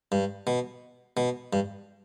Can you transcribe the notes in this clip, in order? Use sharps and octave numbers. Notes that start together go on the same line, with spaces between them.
G2
B2
B2
G2